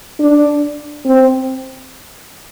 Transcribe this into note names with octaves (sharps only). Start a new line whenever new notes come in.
D4
C4